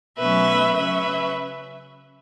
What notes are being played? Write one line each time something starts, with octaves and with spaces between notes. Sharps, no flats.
B2 F#3 A3 C#4 B4 E5
C#3 F#3 C#4 B4 E5